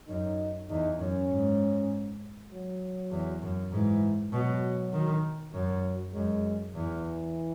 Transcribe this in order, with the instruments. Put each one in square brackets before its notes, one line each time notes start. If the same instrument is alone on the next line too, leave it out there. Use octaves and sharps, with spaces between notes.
[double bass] F#2 [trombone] D#4
[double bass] E2 [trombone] D#4
[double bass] F#2 [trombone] C#4
[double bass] G#2
[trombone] F#3
[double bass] E2
F#2
[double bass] G#2 [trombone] E3
[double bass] B2 [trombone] F#3
[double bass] D#3
[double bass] F#2 [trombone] F#3
[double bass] F#2 [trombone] G#3
[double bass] E2 [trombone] E3